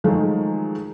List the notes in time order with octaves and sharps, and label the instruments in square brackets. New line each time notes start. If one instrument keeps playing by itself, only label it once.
[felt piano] D#3 F3 F#3 G#3 A3